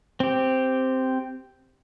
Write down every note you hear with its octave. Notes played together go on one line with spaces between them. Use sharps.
C4 G4